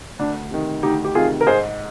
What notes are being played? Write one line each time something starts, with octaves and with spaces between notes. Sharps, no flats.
D2 D4
C3 D#3
D2 D#4 G4
G4
C3 D#3 F4 G#4
A#4
G#2 G#4 C5